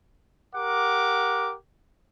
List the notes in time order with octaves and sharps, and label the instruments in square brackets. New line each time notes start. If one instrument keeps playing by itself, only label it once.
[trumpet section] G4 A#4 F#5 D6